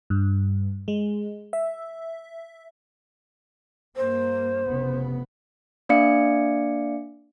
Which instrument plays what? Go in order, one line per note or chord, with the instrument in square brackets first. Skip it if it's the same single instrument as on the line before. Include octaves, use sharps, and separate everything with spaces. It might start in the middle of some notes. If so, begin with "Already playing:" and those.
[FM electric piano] G2
G#3
E5
[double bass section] G2 A#3 [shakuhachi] C5
[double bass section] F1 C#3 B3
[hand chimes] A#3 D4 D5 F5 C#7